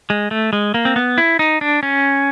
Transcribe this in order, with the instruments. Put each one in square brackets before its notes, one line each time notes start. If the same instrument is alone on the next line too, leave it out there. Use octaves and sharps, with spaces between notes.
[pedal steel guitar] G#3
A3
G#3
A#3
C4
B3
E4
D#4
D4
C#4